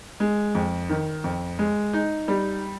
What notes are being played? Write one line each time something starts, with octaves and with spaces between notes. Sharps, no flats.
G#3
F2
D#3
F2
G#3
D#4
G3